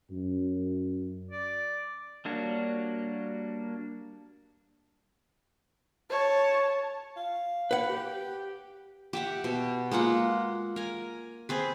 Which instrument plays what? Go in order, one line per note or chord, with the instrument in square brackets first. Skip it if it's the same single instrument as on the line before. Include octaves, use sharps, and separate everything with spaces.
[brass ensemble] F#2
[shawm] D5
[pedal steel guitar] G3 A#3 D4 F#4 C#5
[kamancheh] C#5 A5
[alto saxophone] F5
[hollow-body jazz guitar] B4 F#5
[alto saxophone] G4
[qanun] G4 E5 F#5
B2
G#3 A#3 F4 F#5
A#4 G#5
C4 G#4 B4